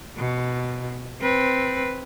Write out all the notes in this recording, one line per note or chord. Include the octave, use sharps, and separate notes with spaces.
B2
C4 B4